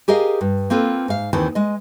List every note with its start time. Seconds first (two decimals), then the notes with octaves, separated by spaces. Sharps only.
0.08 G4 G#4 A#4 D#5 F5
0.41 G2
0.70 A#3 C4 F4 A4 B4
1.08 G#2 F5
1.33 D#2 D#3 E3 C4 A5
1.55 G#3 D#5